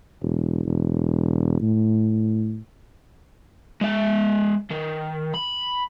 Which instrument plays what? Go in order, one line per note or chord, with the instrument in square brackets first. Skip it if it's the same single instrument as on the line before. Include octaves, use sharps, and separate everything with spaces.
[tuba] E1
E1
A2
[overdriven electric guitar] G#3 E5
D#3
B5